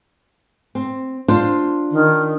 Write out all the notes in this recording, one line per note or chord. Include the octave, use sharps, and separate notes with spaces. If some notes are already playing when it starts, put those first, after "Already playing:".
C4
D4 F4 C5
D#3